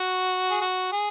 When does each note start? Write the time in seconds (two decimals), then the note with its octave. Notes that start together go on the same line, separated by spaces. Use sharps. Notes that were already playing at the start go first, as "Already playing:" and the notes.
Already playing: F#4
0.51 G#4
0.62 F#4
0.92 G#4